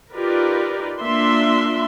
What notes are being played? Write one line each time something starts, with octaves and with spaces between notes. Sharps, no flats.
D#4 F4 G4 A#4 B4 D5
A#3 D4 F4 E5 C6